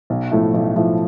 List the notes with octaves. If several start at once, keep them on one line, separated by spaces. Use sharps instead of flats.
B1
A2 F3 A3
B1
A2 F3 A3